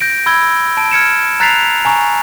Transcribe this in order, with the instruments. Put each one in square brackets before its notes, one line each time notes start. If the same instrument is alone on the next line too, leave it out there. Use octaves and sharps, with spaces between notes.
[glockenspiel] G6 A#6 D7
B5 E6 G#6 G7
A5 D7
F6 G#6 C#7 E7
A#5 F#6 A6 B6 C7 F7
G#5 A#5 C#6